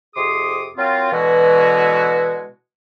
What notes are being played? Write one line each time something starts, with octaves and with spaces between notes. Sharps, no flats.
F2 C3 G#4 C6 D6 D#6
F#3 A#3 C4 F4
B2 D3 E3 G#3 E4 F#4